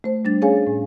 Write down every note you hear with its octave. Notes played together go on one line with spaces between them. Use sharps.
A3 C5
G3 D4 A6
C#4 G#4 C#5 F5 G#5
A2